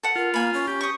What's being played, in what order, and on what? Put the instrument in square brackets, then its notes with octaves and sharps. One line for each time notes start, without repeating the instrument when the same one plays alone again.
[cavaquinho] A4 F#5
[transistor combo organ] F4 [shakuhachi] A#4
[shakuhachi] A#3 [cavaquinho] G#5 B5
[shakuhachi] C#4
[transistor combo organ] G4
[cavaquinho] C#6 D#6